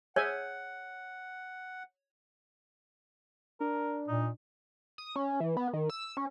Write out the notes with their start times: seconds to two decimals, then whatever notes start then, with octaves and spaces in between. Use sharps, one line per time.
0.16 G#4 C#5 E5 F#5 G#5
3.60 D4 A#4
4.08 A#2 D#4
4.98 D#6
5.16 C#4
5.40 E3
5.57 B3
5.73 D#3
5.90 E6
6.17 C#4